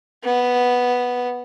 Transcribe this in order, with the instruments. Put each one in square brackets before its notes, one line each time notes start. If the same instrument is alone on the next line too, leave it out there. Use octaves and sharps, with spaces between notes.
[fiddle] B3